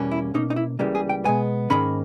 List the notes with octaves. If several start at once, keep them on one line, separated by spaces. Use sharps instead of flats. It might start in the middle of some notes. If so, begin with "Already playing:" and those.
Already playing: E2 B2 G3 A#3 C#4
E4
B2 A#3 C#4 D#4
D#4
E4
C#2 C#3 E3 G3 A#3
G#4
G5
B2 G#3 B3 G#5
G#2 D#3 A#3 C#4 B5